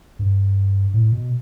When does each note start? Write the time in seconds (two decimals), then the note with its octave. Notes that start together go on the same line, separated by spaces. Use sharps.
0.19 G2
0.94 A2
1.12 B2